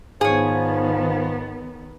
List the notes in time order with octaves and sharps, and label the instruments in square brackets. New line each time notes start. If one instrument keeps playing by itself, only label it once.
[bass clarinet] G#2 [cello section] D#3 B3 [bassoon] F3 [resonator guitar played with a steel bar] G#4 C#5